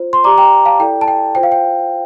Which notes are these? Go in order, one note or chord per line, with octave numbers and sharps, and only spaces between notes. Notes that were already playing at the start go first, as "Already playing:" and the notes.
Already playing: F4 C5
C6
G4 D5 A#5 D6
G5 A#5
F5 A5
E4 A4 D5 G5
A5
G5
F4 C5 G5
F5
G5